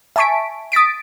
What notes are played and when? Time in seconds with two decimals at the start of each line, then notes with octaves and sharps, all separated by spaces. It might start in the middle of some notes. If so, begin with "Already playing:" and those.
0.16 E5 G#5 A5 C#6 B6 D7
0.72 D#6 A6 B6 D7